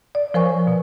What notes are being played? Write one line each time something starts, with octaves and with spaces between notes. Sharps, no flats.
D5
F3 A#4 C5 C#5 G#5 C#6
B2